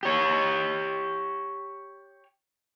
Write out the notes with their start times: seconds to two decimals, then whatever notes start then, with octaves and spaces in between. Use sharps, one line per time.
0.03 G4 C#5